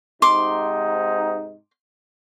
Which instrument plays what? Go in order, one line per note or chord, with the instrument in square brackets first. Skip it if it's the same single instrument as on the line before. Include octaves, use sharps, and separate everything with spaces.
[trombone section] G#2 C3 D#4 [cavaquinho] C6 D6